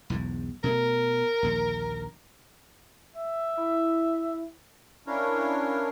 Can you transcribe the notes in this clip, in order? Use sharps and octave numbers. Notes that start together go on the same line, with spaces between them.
B1 E2 G#2
B2 A3 A#4
A#1 D#2 D3
E5
E4
C#4 D4 E4 A#4 C#5 F5